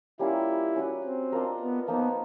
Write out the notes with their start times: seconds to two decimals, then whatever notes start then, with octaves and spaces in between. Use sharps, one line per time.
0.19 G3 A#3 C#4 E4 F4
0.76 C#4 F#4 B4
1.04 C4
1.32 D4 F4 A#4 D#5
1.60 B3
1.88 F3 A#3 B3 D#4